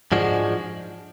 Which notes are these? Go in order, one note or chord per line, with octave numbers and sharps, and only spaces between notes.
G#2 F3 G#3 D4 F#4